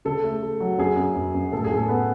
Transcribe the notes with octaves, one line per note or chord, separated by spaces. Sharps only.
C#3 A4
A3
A3
F#3
F#2 G#4
F#2
F#2
F#2
A2 A4
G#4
A2
A4
B3 B4